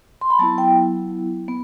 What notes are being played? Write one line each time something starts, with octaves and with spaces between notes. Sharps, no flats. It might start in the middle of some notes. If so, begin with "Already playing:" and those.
C6
B5
F#3 B3 E4 A5
G5
B3